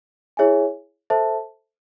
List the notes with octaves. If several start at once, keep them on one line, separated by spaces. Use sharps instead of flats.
E4 G#4 C#5 E5 G#5
A4 C5 E5 A5